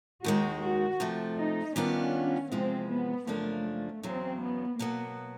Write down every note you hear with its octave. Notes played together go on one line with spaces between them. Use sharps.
D#2 D#3 G#3 F#4
F#4
C3 F3 A3
D#4
D#3 G3 B3 C#4 D4 F4
E2 C3 F3 G#3 C4
B3
F#2 C#3 F3 A3 A#3 D4
E2 C#3 F#3 C4
B3
B2 F#3 A#3 B3